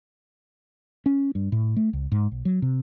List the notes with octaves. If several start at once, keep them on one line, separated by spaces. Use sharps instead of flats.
C#4
G2
A2
A3
C#2
G#2
B1
F#3
C3